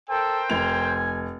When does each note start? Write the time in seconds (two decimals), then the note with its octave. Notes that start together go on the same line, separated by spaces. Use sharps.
0.10 A4 A#4 C5 G5
0.50 F1 G#5 F7